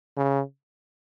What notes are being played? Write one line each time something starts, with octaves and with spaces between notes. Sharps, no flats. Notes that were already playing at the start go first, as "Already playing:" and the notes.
C#3